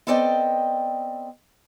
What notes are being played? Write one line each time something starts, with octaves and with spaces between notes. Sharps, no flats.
B3 C4 A4 D5 D#5 G5